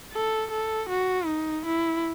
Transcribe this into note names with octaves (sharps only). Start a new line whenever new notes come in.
A4
A4
F#4
D#4
E4